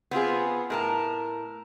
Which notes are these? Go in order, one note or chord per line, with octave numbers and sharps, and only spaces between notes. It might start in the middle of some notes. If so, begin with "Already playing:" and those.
B3 C4 F4 G#4
A2 A#4 A5